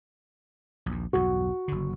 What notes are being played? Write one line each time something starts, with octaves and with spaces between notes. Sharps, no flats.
A#1 D#2
B1 E2 G2 F#4
F#1 D3